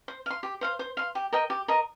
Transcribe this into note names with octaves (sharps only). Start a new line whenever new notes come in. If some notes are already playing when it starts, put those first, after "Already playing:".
C5
F5 C6
G4
C5 F5 C6
C5
F5 C6
G4
A#4 D#5 G5
G4
A#4 D#5 A#5